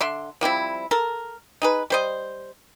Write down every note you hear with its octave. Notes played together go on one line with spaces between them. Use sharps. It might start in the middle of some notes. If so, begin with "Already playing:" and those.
D3 E5 C6
F3 G3 C4 E4
A4 A#4
D#4 G#4 B4
G3 C5 D#5